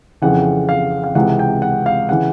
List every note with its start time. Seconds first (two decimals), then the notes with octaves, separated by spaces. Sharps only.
0.22 F2 C#3 E3 F#5
0.69 F5
1.04 F5
1.15 C#2 C3 E3 F#5
1.39 G5
1.62 F#5
1.86 F5
2.09 C#3 E3 F#5